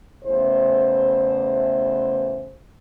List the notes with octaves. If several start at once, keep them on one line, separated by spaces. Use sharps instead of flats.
E2 C#3 E3 A3 C5